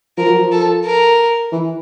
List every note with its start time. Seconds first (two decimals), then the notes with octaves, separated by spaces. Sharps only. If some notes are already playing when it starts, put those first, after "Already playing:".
0.17 F3 A#4
0.28 F#3
0.39 F3
0.52 A4
0.85 A#4
1.52 E3